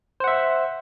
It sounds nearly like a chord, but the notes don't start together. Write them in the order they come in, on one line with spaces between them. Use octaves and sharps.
C5 F#5 E5